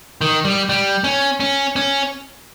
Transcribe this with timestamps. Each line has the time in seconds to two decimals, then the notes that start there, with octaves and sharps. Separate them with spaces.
0.21 D#3
0.45 G3
0.69 G3
1.04 C#4
1.40 C#4
1.76 C#4